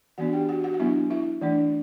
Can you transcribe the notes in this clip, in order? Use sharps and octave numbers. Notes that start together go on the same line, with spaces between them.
E3 B3 D4 F#4 F#5
G4 G5
F#4 F#5
F#4 F#5
F#5
F#3 B3 D4 E4 E5
E4 E5
E3 A3 D4